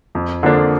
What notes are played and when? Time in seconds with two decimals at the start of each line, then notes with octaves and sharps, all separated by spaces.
0.15 F2
0.43 D3 F3 A#3 D4